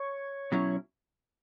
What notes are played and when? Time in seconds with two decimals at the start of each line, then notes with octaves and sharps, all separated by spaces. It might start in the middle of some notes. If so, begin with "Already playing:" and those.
Already playing: C#5
0.52 B2 F#3 C#4 E4